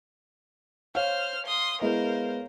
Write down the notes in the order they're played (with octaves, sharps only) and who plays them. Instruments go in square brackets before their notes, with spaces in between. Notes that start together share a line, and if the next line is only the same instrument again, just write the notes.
[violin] C5 F6 [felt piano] C#5 F5
[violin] C6 D#6
[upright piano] G#3 B3 E4 [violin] A#4 C5